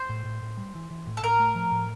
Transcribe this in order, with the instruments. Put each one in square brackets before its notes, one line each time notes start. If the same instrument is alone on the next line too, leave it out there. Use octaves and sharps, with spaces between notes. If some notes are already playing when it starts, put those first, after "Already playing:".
Already playing: [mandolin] C5
[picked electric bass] A2
A2
A2
G3
E3
E3
A2
[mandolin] A4
[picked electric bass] A2 [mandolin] A#4
[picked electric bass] A3
F3
A2